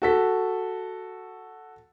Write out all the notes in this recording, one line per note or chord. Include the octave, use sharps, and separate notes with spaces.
F#4 A4 B6